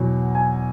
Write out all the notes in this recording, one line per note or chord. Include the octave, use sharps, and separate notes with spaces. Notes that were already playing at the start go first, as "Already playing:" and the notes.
Already playing: E2 B2 F#3
G#5